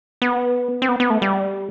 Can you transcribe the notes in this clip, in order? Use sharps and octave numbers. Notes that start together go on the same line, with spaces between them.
B3
C4
B3
B3
A3
G3